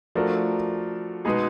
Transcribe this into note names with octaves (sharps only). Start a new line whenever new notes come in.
F3 A3 D4 F#4 A#4
B2 G#3 B3 D#4 G#4